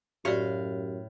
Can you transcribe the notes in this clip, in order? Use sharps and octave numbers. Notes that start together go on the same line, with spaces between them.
F#2 A2 F#4 G4 D5 F5